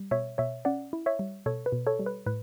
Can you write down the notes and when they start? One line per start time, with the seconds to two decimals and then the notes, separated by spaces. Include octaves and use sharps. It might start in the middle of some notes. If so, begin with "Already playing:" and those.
Already playing: G3
0.11 B2 C#5 E5
0.38 B2 C#5 E5
0.65 C#4 D5 F#5
0.93 E4
1.06 C#5 E5
1.19 G3
1.46 B2 A4 C#5
1.66 B4
1.72 B2
1.87 A4 C#5
1.99 G3
2.06 B4
2.26 A2 B4